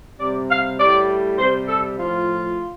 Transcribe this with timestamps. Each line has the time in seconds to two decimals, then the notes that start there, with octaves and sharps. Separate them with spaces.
0.19 C3 G3 D5
0.50 F5
0.79 A2 G3 D5
1.39 C3 G3 C5
1.68 A4
1.98 A2 F3 F4